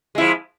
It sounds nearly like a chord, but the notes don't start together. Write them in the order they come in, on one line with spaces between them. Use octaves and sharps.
G#3 E4 F3